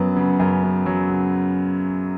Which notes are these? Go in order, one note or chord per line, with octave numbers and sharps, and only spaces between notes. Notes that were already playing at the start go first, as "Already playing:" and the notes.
Already playing: F#2 F#3 B3
C#3
F#2
B3
F#3
C#3